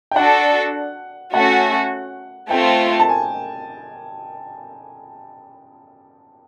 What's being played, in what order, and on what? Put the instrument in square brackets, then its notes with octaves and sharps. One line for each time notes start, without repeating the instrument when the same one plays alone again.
[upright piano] G5
[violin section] D4 F#4 A4 [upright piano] F#5
[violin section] A3 C#4 F#4 [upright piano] F#5
[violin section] A3 C4 F4 [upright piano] G5
[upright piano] A5
G#5